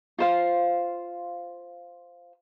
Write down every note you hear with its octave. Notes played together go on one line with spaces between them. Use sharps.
F4 C5 F5